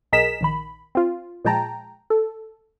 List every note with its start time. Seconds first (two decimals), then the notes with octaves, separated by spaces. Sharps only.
0.12 B1 G#4 A#4 D#5 B6 E7
0.41 A#1 D#3 B5
0.95 C4 F4
1.45 A#2 F3 G#3 G5 A5 A#5
2.10 A4